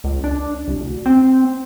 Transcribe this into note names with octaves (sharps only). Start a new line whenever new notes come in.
C#2
D4
C2
D2
C4